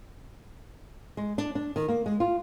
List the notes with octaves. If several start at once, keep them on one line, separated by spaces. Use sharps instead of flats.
G#3
D4
D4
D#3
A#3
G#3
F4